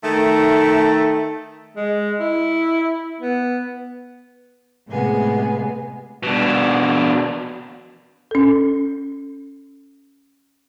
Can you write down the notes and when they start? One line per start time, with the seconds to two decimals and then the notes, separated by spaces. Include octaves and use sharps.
0.03 D#3 A3
1.76 G#3
2.20 E4
3.20 B3
4.87 A2 C3 G#3 B3 G#4
6.23 B2 D4
8.31 C#4 A4